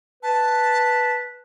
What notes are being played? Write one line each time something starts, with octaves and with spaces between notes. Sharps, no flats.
B4 A5